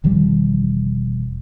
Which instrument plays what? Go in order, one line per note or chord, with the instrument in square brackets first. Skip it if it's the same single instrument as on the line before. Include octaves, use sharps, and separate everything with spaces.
[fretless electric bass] E1 D#3 F3 G3